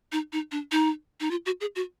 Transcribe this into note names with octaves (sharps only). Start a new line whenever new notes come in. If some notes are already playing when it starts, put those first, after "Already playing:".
D#4
D#4
D4
D#4
D#4
F4
F#4
G#4
F#4